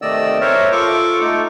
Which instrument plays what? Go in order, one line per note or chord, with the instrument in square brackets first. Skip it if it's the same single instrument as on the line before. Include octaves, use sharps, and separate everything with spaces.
[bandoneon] C3 D#3 A3 D5 D#5 E6
A#4 C5 C#5 E5
F4 A4 C#6 D6
A3 D#4 F4